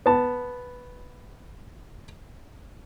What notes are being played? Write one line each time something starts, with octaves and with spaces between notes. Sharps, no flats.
B3 A5